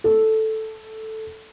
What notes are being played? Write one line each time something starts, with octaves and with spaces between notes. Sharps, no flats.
A4